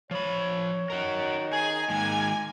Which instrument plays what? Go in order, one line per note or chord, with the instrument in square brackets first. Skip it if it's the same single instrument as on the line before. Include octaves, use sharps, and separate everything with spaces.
[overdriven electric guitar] F3 B5 [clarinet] C#5
[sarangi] D#3 [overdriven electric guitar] F#4 A#4
[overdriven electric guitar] G#4 [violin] G#5
[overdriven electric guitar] D#3 G#3 [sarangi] A#3 [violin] G#5